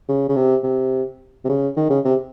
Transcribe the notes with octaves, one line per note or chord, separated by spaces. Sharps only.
C#3
C#3
C3
C3
C3
C#3
D#3
C#3
C3